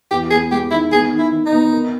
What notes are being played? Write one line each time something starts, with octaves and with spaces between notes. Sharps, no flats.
E2 G4
B3 G#4
G#3 G4
D#3 E4
B3 G#4
D#3
E4
D#3
D#4
B3
A#4